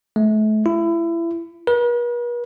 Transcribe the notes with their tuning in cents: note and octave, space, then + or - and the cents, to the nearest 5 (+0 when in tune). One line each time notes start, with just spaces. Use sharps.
A3 -35
E4 +25
B4 -45